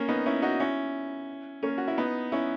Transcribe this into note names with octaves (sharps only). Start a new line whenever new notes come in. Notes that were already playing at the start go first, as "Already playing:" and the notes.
Already playing: A#3 C#4
B3 D#4
C#4 E4
D#4 F#4
C#4 E4
A#3 C#4
F#4
E4
B3 D#4
C#4 E4